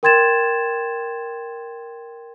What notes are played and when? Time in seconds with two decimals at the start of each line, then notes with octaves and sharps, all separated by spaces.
0.03 A#4 G5 C6 G#6 A6 E7